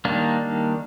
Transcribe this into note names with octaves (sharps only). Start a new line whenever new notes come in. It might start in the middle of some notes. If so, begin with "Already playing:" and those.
D#3 G3 A#3 D4